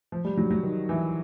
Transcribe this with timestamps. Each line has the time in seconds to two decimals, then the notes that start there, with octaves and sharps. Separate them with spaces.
0.12 F3
0.25 G3
0.37 F#3
0.50 F#3
0.63 D#3
0.89 E3